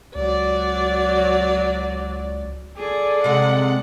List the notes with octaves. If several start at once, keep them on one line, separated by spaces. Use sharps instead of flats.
C#2 F#3 D5
G#4 A4 D5
C3 G#3 F#5